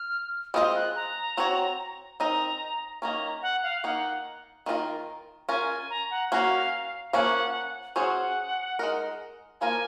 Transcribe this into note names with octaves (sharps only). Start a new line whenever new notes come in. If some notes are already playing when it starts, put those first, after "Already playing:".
Already playing: F6
G#3 C4 F4 C5 D#5 D#6
F#6
A#5
C4 F#4 C#5
C4 D#4 A#4 D#5 A#5
D#3 A#3 C#4 A#5
F#5
F5
D#3 A#3 D#4 F#5
D#3 A#3 C#4 F4 A#4
C#4 F4 A#4 G#5
A#5
F#5
A#3 C#4 F#4 F5
F3 A#3 C#4 F#5
F#3 C#4 G#4 C5 F#5
G#3 D#4 A#4
F3 A#3 F4 A#4 G#5